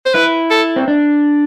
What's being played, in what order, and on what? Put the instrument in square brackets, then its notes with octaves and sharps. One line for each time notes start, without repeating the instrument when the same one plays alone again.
[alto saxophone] C5
[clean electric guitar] E4 [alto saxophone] B4
[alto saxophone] A4
[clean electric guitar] C4
D4